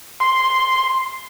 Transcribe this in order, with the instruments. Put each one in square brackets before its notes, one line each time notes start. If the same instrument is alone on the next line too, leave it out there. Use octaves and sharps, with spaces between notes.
[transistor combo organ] C6